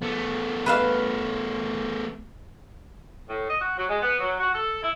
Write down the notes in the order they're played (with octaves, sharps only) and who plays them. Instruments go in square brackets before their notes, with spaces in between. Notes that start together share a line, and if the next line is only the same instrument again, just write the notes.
[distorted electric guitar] A3 B3
[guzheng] B4 E5 F5
[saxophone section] A2
D#5
F#4
F#3
G#3
B3
F#3
F#4
A4
E4